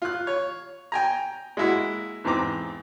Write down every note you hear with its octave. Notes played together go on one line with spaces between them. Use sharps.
F4 F#6
C#5
G5 G#5 A#5
G#3 A#3 E4 F#4
E2 G#2 E3 C4 A#5 D6